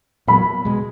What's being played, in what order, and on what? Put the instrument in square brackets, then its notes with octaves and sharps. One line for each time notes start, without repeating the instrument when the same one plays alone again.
[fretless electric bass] A#2 F#3 B3 [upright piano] B5
[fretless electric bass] B2 G#3